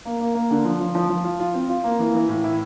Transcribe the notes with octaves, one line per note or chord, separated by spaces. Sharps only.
A#3
A#3
A#3
D3
F3
F3
F3
F3
F4
F4
C4
F4
A#3
E3
E3
A2
E4